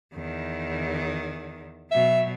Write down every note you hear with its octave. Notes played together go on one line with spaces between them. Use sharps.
E2 D#3
B2 F#3 E5